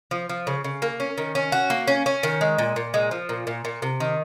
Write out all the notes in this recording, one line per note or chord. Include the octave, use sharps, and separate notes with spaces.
F3
F3
C#3
C#3
A#3
C#4
D#3
C#4
F#4
A#3
C#4
C#4
D#3
G#3
A#2
A#2
G#3
F3
A#2
A#2
A#2
C3
D#3